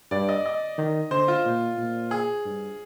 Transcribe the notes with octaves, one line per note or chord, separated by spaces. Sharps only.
G2 D5
D#5
D#5
D#3
D3 C5
F4
A#2
A#2
G#4
G2